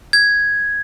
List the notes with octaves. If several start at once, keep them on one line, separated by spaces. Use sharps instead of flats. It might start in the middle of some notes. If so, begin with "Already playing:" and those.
G#6